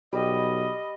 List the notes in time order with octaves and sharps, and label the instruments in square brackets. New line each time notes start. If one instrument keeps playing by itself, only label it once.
[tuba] B1 [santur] G3 [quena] D#5